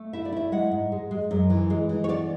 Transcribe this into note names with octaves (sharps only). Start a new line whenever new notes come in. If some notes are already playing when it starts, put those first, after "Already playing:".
Already playing: A3
E4 E5
D5
E4 E5
G#3 F#5
G#2
G#3
G#3
F#2
E3
G#3
E3
C#5
B3 D5